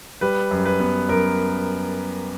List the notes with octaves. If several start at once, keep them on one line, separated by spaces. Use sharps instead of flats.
G3 B4
F#2
B4
B3
F#2 A#4